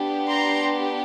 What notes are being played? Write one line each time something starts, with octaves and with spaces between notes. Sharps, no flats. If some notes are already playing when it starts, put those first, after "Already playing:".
Already playing: B3 D4 G4
A#5 C6